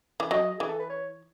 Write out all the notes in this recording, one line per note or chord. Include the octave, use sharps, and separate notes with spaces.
E3
F#3 D#5
E3 G#4
A4
B4
C#5